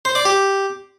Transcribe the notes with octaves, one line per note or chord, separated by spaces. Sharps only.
C5
D5
G4